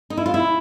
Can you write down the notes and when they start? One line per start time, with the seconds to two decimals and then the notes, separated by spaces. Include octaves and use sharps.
0.10 D#4
0.17 E4
0.26 F4
0.34 E4